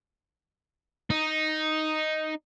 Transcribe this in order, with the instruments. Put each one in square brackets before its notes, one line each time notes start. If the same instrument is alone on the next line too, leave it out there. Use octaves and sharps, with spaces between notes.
[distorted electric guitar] D#4